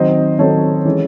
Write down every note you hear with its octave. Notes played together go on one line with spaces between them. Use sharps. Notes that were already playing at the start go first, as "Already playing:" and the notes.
Already playing: D#3 F#3 C4 C5 D#5
D#3 F#3 C4 A4 C#5
E3 G#3 C#4